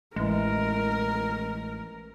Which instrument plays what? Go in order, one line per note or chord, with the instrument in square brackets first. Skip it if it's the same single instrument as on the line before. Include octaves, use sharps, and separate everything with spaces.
[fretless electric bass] A1 E3 [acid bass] G#3 [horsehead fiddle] A#4